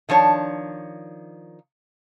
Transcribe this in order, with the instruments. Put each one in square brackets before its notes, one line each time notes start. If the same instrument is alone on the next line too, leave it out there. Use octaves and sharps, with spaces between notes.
[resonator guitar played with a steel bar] D#3 F3 D4 C#5